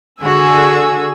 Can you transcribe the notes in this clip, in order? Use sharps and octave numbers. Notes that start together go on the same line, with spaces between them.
D3 F#4 G#4 G#5 E6